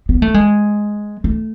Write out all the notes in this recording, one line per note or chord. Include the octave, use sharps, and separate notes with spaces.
B3
A3
G#3
A3